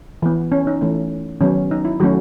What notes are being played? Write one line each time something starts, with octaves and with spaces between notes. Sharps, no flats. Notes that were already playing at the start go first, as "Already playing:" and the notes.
E3 B3
C#4
D#4
E3 A3 C#4
D#3 F#3 B3 C#4
D#4
E4
D#3 F#3 A3 C#4 F#4